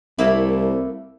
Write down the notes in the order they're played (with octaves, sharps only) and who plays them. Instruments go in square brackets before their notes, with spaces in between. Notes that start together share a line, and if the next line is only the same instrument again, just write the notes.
[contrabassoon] C2 [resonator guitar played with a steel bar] A3 A#3 E4